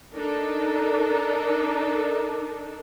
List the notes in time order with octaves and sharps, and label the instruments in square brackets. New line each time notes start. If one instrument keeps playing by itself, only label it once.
[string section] D4 D#4 A4 A#4